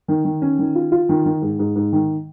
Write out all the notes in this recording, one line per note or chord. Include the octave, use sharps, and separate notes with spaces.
D#3
D#3
C#4
D#3
F4
F4
D#3
D#3
G#2
G#2
G#2
D#3